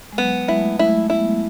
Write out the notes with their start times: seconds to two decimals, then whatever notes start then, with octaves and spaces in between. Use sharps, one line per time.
0.12 G#3
0.18 F#3 B3
0.48 G#3 E4
0.57 A3
0.65 G#3
0.79 A3 E4
1.10 B3 E4